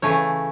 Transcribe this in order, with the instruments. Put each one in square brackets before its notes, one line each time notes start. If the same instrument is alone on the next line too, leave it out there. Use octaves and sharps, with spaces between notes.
[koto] C#3 E3 A3 C#5